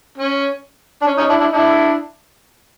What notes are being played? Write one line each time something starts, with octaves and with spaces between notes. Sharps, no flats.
C#4
D4
C#4
C#4 D#4
D4 E4
D4 E4
D4 E4